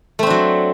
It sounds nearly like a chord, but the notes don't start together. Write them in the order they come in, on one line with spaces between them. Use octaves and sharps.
A3 C4 D4 F#3